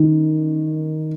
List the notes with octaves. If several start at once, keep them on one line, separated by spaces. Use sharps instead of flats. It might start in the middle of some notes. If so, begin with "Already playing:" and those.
Already playing: D#3